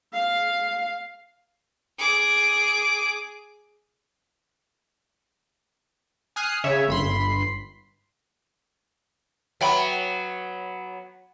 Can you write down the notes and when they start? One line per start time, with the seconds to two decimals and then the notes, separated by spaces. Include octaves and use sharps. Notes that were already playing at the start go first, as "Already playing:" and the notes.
0.13 F5
1.99 G#4 D6
6.36 G#5 D#6 F6 F#6 C7
6.64 C#3 C#5 E5
6.88 G1 B5 C6
9.61 F#3 B3 E5 G5 B5